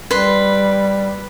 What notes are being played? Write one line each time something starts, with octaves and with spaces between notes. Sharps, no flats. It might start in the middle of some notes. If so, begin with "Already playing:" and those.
G3 B4 C6